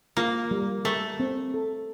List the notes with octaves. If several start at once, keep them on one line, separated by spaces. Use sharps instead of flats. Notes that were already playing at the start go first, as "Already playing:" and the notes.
A#3 F4
G3
A3 A#4
C4
A4